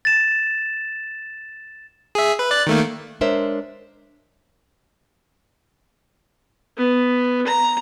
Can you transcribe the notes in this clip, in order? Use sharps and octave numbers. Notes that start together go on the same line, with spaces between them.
A6 E7
G#4 E5
B4
D5 F#6 A6
D#3 A3 A#3
G#3 D4 A#4 C5 C#5 E5
B3
A#5